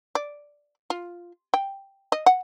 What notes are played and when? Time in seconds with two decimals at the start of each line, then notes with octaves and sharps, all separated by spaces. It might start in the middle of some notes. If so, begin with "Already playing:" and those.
0.15 D5
0.90 F4
1.54 G5
2.12 D#5
2.26 F#5